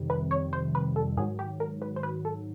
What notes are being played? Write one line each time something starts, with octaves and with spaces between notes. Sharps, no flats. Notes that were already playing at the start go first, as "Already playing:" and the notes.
Already playing: F2 C3 D#3 G3
B4
C#5
C5
B4
A4
G#2 D#3 F#3 G#4
G4
A#4
B4
C5
B4
A4